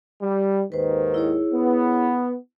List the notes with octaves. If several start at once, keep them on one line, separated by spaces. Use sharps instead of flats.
G3
D#2 G#2 D#3 B4 C5
E4 G#4 C#5
B3